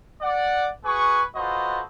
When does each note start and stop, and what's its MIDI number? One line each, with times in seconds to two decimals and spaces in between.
0.22 0.69 74
0.22 0.69 78
0.85 1.22 66
0.85 1.22 68
0.85 1.22 71
0.85 1.22 80
0.85 1.22 85
1.36 1.82 65
1.36 1.82 66
1.36 1.82 69
1.36 1.82 71
1.36 1.82 72
1.36 1.82 75